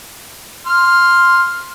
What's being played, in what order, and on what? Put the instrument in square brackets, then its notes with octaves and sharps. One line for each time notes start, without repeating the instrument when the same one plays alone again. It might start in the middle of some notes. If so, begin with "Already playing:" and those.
[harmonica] C6 F6